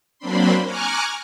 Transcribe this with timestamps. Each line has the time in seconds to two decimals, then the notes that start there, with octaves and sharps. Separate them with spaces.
0.19 F#3 A#3 C4 D4 B5 C6
0.64 G#5 A#5 C#6 D6 F6 F#6